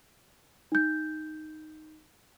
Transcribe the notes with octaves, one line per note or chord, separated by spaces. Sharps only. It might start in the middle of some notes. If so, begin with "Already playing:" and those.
D#4 G6